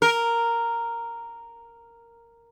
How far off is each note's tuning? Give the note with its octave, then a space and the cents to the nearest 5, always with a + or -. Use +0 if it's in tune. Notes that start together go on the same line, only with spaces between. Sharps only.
A#4 -5